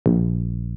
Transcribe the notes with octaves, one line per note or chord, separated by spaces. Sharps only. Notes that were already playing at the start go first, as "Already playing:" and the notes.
A#1